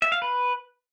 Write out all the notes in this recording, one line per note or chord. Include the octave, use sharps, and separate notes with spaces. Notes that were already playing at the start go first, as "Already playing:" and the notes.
E5
F5
B4